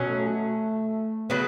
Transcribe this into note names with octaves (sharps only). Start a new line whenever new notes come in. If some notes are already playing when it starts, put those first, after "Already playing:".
Already playing: B2 F#3 C#4
A3
C#3 F#3 B3 F#4